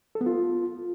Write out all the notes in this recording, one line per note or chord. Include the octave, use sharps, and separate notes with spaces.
A4
B3
F4